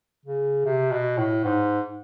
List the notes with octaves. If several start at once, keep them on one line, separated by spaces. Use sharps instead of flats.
C#3
C3
B2
A2
G#2